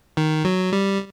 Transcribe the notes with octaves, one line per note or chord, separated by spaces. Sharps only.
D#3
F#3
G3